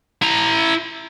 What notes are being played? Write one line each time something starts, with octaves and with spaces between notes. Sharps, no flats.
E4 A#5